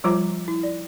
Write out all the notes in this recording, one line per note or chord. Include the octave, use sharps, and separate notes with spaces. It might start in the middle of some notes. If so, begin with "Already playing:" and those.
F3 G3 F4 C5 A#5 D6
E4
D5